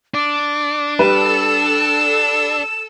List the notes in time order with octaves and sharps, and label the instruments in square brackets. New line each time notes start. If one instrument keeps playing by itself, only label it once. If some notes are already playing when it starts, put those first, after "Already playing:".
[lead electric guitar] D4 [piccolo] D6
[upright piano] G3 B4 [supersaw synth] A4 E6 [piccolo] E7